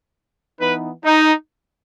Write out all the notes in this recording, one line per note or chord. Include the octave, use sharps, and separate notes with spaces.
E3 B3 D#4 B4
D#4